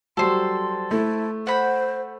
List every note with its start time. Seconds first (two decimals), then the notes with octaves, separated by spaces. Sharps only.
0.17 F#3 G3 A4 C5 C6
0.91 A3 E4
1.47 C5 F#5 B5